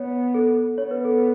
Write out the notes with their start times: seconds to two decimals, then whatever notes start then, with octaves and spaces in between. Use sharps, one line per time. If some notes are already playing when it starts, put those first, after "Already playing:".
Already playing: B3 C#5
0.34 A4
0.78 B3 C#5
0.91 B4
1.05 A4
1.18 B4